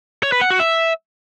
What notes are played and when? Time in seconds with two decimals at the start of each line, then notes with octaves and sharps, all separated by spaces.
0.23 C#5
0.32 B4
0.41 F#5
0.51 F#4
0.60 E5